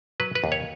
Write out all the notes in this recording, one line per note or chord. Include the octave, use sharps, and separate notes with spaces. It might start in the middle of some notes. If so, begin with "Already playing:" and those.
F#3 B4
B4
D#2
C#5